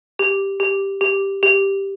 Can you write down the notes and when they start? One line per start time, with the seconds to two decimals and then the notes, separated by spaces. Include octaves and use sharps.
0.19 G4
0.60 G4
1.01 G4
1.43 G4